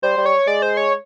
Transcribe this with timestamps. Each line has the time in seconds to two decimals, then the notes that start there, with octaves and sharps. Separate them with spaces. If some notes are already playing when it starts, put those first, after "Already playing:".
0.03 G3 C5
0.17 G3
0.26 C#5
0.47 G#3 D5
0.62 C5
0.77 C#5